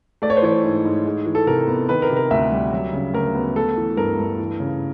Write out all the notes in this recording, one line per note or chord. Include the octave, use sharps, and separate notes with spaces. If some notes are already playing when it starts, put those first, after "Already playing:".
A3 D5
C#5
C5
E3 C#5
G#2
G#2
G#3
E3
A4
C3 A#4
B3
D#3 B4
A#4
C3
A#4
D2 E5
G3
F#3
C#3
D2 A#4
B3
A3 A4
E3
G2 A#4
G2
E3
C#3